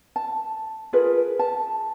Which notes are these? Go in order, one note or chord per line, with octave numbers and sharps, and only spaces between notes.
A5
F4 G#4 A#4 B4
A5